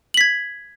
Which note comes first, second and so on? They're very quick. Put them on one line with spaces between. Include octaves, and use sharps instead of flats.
F#7 B6 G#6